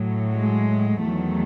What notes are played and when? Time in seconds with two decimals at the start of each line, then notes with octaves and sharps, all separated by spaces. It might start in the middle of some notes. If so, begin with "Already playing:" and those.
Already playing: A2 F#3
0.37 G#3
1.00 E2 D#3 F#3 A3